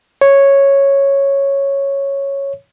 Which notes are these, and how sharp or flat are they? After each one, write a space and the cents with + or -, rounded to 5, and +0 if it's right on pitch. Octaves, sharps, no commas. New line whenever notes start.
C#5 -5